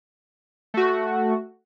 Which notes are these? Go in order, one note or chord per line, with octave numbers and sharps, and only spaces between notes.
A3 F#4